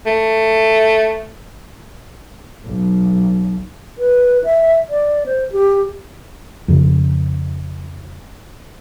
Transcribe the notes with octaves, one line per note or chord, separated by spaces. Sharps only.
A3
B1
B4
E5
D5
C5
G4
F2 C#3